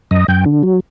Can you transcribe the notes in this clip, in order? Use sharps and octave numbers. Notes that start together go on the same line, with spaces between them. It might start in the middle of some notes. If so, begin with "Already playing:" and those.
F#2 D#5
F#2 G5
D3
F#3